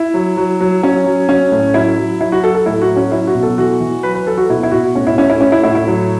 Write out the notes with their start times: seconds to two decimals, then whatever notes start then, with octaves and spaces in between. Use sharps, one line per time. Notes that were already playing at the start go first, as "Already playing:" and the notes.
Already playing: E4
0.14 F#3
0.37 F#3
0.61 F#3
0.82 F#3 C#4
1.06 F#3
1.29 F#3 C#4
1.52 A2
1.74 F#3 E4
1.97 F#3
2.21 F#3 E4
2.32 F#4
2.43 F#3 A4
2.55 A4
2.66 A2 E4
2.82 F#4
2.89 F#3
2.96 C#4
3.12 F#3 E4
3.27 F#4
3.35 B2
3.43 A4
3.58 E3 F#4
3.80 E3
4.03 F#3 B4
4.15 B4
4.27 F#3 A4
4.38 F#4
4.49 B2 E4
4.63 E4
4.72 B2 F#4
4.95 A2 C#4
5.07 E4
5.18 A2 C#4
5.30 E4
5.41 A2 C#4
5.52 E4
5.64 A2 E4
5.75 E4
5.87 F#3